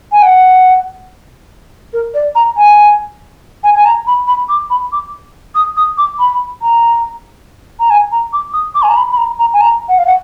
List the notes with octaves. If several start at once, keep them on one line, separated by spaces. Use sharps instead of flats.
G#5
F#5
A#4
D5
A#5
G#5
G#5
G#5
A#5
B5
B5
D6
B5
D6
D#6
D#6
D6
B5
A#5
A#5
G#5
A#5
D6
D#6
D6
G#5
A#5
B5
B5
A#5
A#5
G#5
A#5
F#5
F5
F#5